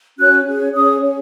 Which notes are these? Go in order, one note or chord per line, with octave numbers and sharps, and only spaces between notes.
C#4 F#4 C#5 F#6
C#4 G#4 C#5
C#4 G#4 C#5 D#6
C#4 G#4 C#5